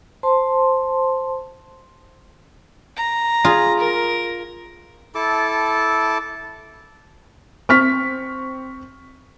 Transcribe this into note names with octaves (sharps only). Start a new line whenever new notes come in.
C5 A5 C6
A#5
F4 G#4
A#4
E4 A4 A5 D6
C4 C#6 F6 B6